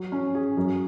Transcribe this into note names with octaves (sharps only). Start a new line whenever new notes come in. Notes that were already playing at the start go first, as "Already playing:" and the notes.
Already playing: F#3
C#4
G#4
F#2